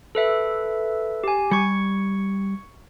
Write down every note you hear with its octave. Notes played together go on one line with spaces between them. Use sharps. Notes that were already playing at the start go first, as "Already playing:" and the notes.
A4 B4 E5
G4 G#5
G3 C#6 G#6 C#7